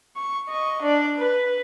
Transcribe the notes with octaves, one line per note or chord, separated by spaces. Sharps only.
C#6
D#5 C#6
D4 D5
B4